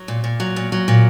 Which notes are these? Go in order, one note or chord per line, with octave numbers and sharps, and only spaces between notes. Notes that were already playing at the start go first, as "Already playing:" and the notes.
Already playing: F#3
A#2
A#2
F#3
A#2
F#3
A#2